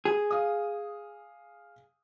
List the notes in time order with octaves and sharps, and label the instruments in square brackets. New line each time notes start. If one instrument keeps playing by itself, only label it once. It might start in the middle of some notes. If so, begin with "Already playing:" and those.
[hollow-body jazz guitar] G#4
[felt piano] F5 D#6